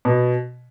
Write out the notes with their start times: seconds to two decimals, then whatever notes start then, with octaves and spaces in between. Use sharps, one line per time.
0.05 B2